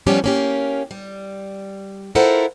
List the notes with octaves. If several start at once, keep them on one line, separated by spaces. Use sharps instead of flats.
A2 F3 G3 B3 C#4 G4
A#3 C#4 G4
G3
E4 F4 A4 A#4 C5 F#5